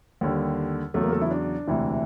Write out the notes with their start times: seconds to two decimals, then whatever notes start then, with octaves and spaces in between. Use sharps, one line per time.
0.21 D#2 D3 G3
0.94 E2 C#3 F#3 A3 A4
1.03 A#3 A#4
1.12 A3 A4
1.22 E3 E4
1.31 D4
1.68 E1 D2 C3 E3